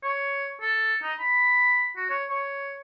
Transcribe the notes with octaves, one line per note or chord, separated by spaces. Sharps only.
C#5
A4
D#4
B5
F#4
C#5
C#5